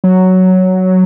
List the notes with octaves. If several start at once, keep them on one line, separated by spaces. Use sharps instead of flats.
F#3